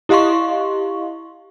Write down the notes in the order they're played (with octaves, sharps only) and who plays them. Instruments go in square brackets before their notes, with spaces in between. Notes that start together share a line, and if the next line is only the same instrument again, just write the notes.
[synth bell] E4 G4 D#5 F5 C6 C#6